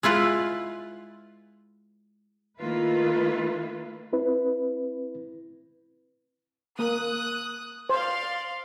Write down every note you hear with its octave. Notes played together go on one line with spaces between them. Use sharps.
G#3 E4 F4 B4
D#3 A3 A#3 E4 F4 B4
C4 E4 B4
A#3 A#4 D#6 F#6
C5 D5 F5 C6